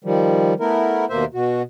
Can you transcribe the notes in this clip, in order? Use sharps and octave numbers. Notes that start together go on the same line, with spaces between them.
D#3 F3 G3
A3 B3 E4 A#4
D#2 B2 A#3 C5 E5
B2 F#4